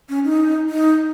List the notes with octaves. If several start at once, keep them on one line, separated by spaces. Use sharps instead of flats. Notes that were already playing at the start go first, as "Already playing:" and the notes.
C#4
D#4
D#4